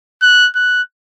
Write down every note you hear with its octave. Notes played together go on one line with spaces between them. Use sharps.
F#6
F#6